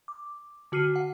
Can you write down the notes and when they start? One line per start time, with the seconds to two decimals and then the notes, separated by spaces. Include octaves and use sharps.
0.08 D6
0.72 D3 F#4 F6 C7 D#7
0.96 F#5